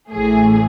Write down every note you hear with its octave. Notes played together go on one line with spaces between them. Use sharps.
A1 A2 E3 A3 G#4